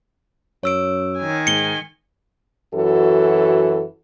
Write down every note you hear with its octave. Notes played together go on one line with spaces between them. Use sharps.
F#2 C#5 E6 D7
D#3 G#5
G#2 C#7 G7
F#2 E3 F#4 A4